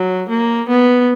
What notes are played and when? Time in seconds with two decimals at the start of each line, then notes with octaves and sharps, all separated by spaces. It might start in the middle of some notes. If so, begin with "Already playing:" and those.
Already playing: F#3
0.29 A#3
0.69 B3